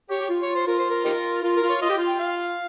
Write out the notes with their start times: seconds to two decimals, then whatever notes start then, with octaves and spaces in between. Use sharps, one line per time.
0.10 G4 C#5
0.20 G4
0.29 F4
0.42 C#5
0.55 C5
0.67 F4 A#4
0.79 C5
0.90 A#4
1.05 D#4 G4 A#4
1.43 F4 A#4
1.56 A#4
1.63 F4
1.69 C#5
1.82 F4 D#5
1.89 G4
1.98 F4
2.07 G5
2.19 F5